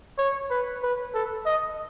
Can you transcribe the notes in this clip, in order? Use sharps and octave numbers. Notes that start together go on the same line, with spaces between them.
C#5
B4
B4
A4
D#5